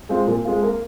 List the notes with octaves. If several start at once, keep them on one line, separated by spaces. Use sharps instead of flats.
G#3 C4 F4
A#2
G#3 C4 F4
A#3